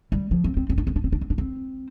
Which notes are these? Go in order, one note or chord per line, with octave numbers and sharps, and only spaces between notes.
G3
F3
C4
C4
C4
D4
C4
D4
C4
D4
C4
D4
C4